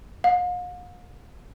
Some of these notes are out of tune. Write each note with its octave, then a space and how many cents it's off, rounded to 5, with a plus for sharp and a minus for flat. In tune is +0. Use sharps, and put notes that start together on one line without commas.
F5 +45